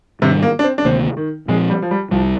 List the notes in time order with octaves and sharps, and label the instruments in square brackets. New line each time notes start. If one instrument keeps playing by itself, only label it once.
[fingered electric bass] G#2 D#3 G3 D4 [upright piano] C3
[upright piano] A#3
D4
C4
D4
[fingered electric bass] D2 C3 D#3 A#3 [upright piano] C4
[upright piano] D#3
[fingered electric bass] A#2 F3 C4 [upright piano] G#3
[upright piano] G3
F3
G3
[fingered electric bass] C2 C3 G3 [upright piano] F3